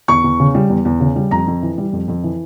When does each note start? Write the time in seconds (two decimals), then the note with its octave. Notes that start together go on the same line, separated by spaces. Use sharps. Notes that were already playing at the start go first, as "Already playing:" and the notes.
0.08 E2 C#6
0.24 E2
0.40 C#3
0.55 G3
0.69 E2
0.85 E2
1.00 C#3
1.16 G3
1.31 F2 A#5
1.47 F2
1.62 E3
1.78 G3
1.93 F2
2.08 F2
2.23 E3